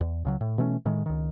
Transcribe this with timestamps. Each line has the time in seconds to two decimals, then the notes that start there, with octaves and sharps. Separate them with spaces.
0.01 E2
0.25 C#2 C#3 F#3
0.41 A2
0.58 B2 E3 A3 C#4
0.86 A2 D#3 G#3
1.06 C#2 D#3